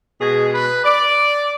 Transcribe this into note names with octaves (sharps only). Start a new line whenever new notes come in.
B2 G#3 G#4
B4
D5